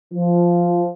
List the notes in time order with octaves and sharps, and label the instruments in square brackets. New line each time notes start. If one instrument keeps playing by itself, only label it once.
[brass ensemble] F3